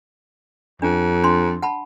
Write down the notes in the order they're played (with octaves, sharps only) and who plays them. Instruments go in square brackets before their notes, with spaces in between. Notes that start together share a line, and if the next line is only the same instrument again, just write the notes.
[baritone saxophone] F2 [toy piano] D4
[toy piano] D4 C6
F#5 A5 B5